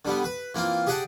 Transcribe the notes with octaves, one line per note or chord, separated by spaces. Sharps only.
D3 G3 B3
B4
E3 A#3 C4 F4
G4 G#4 D5 F#5 G5 A5